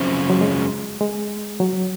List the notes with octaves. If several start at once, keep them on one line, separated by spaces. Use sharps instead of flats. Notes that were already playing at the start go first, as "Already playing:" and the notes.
Already playing: F#2 C#3 F3 C4
F#3
G#3
G#3
F#3